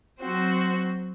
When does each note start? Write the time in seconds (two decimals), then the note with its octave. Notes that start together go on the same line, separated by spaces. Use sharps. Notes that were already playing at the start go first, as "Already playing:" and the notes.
0.20 F#3 C4 F#4 C5